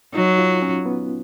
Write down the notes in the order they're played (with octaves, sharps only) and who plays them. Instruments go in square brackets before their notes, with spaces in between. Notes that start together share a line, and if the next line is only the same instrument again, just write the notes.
[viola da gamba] F#3 [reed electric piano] D#4
[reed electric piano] F4
C#4
B3